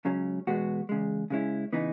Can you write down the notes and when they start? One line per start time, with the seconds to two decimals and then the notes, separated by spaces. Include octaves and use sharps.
0.05 C#2 C#3 F#3 C#4
0.47 E2 B2 G#3 B3 F#4
0.89 E2 C#3 G#3
1.30 C#3 G#3 C#4 E4
1.73 C#3 E3 B3 D#4